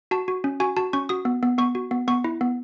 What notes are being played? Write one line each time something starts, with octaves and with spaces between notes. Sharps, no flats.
F#4 A5
F#4
C#4
F#4 G#5
F#4 A5
C#4 C#6
F#4 D#6
B3
B3
B3 C#6
F#4
B3
B3 C#6
E4
B3